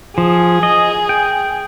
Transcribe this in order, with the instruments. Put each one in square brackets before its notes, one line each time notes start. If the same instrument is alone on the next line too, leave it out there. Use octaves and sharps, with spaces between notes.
[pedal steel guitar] F3 [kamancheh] G#4
[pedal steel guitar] D#5
G5